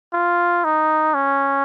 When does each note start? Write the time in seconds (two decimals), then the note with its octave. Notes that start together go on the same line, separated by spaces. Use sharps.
0.14 F4
0.64 D#4
1.14 C#4